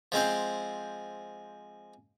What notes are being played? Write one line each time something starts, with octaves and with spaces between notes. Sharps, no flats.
F3 G#3 C4 C5